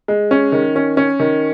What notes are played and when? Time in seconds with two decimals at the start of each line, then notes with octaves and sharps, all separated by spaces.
0.08 G#3
0.31 C#4
0.52 D#3
0.76 C#4
0.97 C#4
1.20 D#3